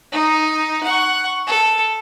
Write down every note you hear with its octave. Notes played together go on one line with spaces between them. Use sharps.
D#4
F#5 C#6
A4